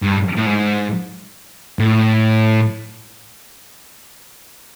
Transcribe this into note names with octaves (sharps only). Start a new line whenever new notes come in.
G2
A2
G#2
A2